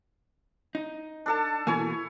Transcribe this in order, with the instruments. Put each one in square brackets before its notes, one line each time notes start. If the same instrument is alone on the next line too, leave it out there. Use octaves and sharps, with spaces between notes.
[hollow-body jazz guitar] D#4
[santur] D4 A4 A5
[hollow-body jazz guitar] B2 E3 A#3 [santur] E4 C#5 G#5